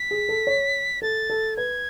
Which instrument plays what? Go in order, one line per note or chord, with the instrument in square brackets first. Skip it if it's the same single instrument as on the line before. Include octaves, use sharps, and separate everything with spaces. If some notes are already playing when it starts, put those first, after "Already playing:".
Already playing: [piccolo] B6
[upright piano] G#4
A4
C#5
[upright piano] A4 [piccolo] A6
[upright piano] A4
[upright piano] B4 [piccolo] G#6